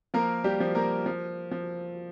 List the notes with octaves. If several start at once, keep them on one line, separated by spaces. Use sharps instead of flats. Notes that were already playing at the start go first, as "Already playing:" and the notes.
F3 A#3 A#4
G3 G4
F3
A#3 A#4
F3
F3